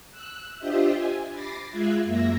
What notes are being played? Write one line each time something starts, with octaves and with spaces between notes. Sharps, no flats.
E6 F#6
D4 F4 G4 C5 D#5 E5
G#5
B5 D6 A6 A#6 C7
G#3 F4 E5 F#6 G#6
F#2 A#3 E5 A#6